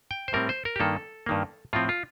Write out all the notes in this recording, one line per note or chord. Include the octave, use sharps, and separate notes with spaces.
G5
C5
A2 G3 C4 A#4
C5
A#4
G4
G2 D#3 A#3 A4
G2 D#3 A#3
A2 F3 C4 F4
F4